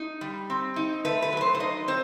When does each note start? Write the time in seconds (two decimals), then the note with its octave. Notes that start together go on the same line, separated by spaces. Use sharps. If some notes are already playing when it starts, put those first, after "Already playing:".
Already playing: D#4
0.21 G3
0.50 C4
0.76 D#4
1.05 A3 B4
1.22 B4
1.32 F#3 B4
1.41 C5
1.55 C5
1.60 D#4 D#5
1.88 C4 C5